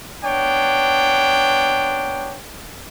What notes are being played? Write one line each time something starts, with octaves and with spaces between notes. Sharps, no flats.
B3 D4 C#5 G5